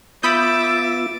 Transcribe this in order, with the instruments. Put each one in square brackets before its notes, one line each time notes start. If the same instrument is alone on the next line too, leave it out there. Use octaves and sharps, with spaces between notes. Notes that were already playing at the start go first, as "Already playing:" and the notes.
[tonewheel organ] B3 F4 [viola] E5 [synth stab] B5 D#6 G6 [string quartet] D6 A6